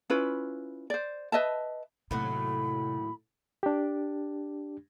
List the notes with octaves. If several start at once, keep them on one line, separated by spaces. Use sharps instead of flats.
C#4 E4 F4 B4
C5 D5
B4 D#5 E5 A5
D#2 A2 C3 F#3 B5
D4 G4